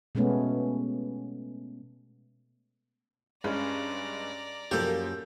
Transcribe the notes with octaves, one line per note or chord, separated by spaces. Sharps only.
B2 G#3 A3 B3 C#4
G2 G#3 C#4 D5 A#5
F#2 F3 A#3 G4 A4